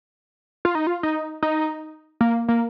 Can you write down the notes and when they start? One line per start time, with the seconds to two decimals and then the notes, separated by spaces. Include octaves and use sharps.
0.65 F4
0.75 D#4
0.87 F4
1.03 D#4
1.43 D#4
2.21 A#3
2.48 A#3